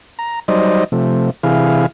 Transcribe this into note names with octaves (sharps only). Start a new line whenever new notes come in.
A#5
F#3 G3 D#4 C5 D5 D#5
C3 F3 A3
C3 E3 E4 G#4 F5